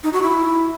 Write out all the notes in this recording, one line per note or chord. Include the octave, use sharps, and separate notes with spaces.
D#4
F#4
E4